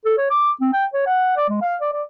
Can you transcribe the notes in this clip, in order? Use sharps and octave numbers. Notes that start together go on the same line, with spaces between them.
A4
C#5
D6
C4
G5
C#5
F#5
D5
G#3
F5
D5
D5